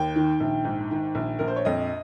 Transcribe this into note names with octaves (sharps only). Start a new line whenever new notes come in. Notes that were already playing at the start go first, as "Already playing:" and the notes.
Already playing: D#2 G5
D#3
A#1
G#2
D#3
A#1
A#1 A#4
C5
C#5
F2 D#5